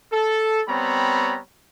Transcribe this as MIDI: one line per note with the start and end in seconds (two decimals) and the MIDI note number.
0.12 0.62 69
0.68 1.39 55
0.68 1.39 59
0.68 1.39 60
0.68 1.39 73
0.68 1.39 82
0.68 1.39 83